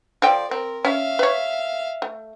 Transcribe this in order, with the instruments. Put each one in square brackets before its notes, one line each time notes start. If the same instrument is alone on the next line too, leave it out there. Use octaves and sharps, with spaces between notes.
[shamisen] F3 A4 G5 [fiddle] D5
[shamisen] C4 [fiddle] A#4
[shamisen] C#4 [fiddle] E5 F5
[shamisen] B4 C#5
A3